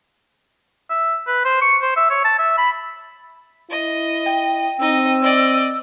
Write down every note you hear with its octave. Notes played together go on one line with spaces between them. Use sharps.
E5
B4
C5
C#6
C5
E5
C#5
A5
E5
B5
E4 D#5
G5
C4 D#4 D#5 E6
D5 D#5